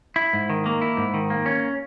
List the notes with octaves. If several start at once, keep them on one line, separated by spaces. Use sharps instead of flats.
E4
G#2
D#3
A#3
E4
G#2
D#3
A#3
C#4